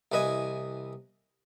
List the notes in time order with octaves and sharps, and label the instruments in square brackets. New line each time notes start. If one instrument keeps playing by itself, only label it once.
[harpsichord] C2 E3 B4 D#5 G#5